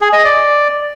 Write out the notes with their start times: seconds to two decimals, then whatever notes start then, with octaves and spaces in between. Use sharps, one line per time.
0.01 G#4
0.13 D#5
0.24 D5